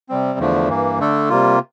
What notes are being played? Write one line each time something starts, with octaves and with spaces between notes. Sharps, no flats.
C3 G3 C4
E2 D3 F3 A3 D4
G2 E3 A#3
D3 A3 D4 A4
C3 G3 A#3 F4